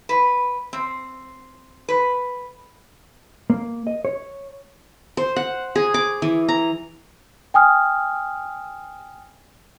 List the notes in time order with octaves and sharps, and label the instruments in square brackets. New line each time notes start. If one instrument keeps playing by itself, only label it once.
[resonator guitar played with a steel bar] B4
C4
B4
[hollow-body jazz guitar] A#3
D#5
C#5
[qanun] C5
F#5
G#4
D6
E3
A#5
[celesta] G5 G#5 D#6 F6